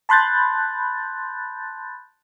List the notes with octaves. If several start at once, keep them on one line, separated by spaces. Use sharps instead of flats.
A5 B5 C6 F#6 G6 A6